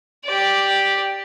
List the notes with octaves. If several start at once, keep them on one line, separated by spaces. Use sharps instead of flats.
G4 D5